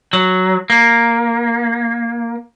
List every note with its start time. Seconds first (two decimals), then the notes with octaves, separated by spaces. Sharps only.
0.13 F#3
0.70 A#3